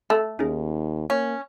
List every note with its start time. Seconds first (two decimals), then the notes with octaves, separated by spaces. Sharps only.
0.10 A3
0.39 D#2 C#4 D#4 G#4
1.10 A#3 C#4